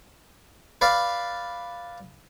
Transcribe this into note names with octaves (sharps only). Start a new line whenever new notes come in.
B4 D5 F5